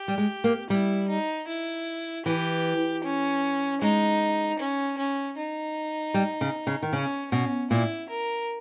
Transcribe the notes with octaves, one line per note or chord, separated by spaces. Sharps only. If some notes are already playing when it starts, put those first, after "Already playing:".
Already playing: G4
G3
G#3
A#3
G3 E4
D#4
E4
E3 G4
C#4
G#3 D#4
C#4
C#4
D#4
G3
C#3
C#3
D#3
C#3 C#4
B2 C#4
A#2 E4
A#4